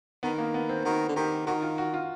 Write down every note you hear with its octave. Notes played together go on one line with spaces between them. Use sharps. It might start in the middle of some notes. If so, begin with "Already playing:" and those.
D#3 B3
A#3
B3
C4
D#3 F#4
D3
D#3 G4
D#3 F#4
F4
F#4
F4